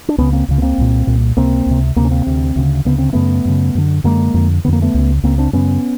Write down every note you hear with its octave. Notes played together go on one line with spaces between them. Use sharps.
D4
C#2 C#3 B3 C#4
A#3 C4
C#2 C#3
B3
A#3 C4
C2 A#2
C2 A#2
C#2 C3 A#3 C4
C#2 C3
D2 C3 A#3 C4
C#4
A#3 C4
D2 C3
D2 C#3
D2 C#3 B3
C4
F#2 C#3 A3 B3
F#2 C#3
F#2 D3
F#2 D3 G#3 A#3
F2 D3
F2 D3 A#3 B3
A3 B3
C#2 C#3
C#2 C#3 A#3 C4
C4 D4
F#2 C#3 B3 C#4